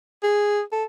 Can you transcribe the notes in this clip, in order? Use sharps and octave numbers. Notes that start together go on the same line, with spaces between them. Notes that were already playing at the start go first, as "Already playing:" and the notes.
G#4
A4